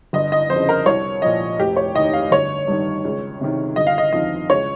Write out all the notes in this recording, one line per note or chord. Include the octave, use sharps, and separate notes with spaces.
G1 D#5
D#5
F2 C#3 C5
A#4
C2 C#5
A#2 F3 D#5
F1 G4
C#5
D#2 D#3 D#5
F5
G1 C#5
G2 D#3
C#2
C3 D#3
G1 D#5
F5
D#5
F2 D#3 D#5
C#2 C#5